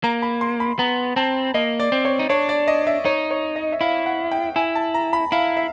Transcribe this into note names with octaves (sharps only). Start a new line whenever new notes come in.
A#3 A#5
B5
C6
B5
B3 A#5
C4 A5
A#3 D#5
D5
C4
C#5
D#4
D4 C#5
D5
D#5
E5
D#4 C#5
C#5
D#5
E5
E4 F5
F#5
G5
E4 G#5
A5
A#5
B5
E4 F5
E5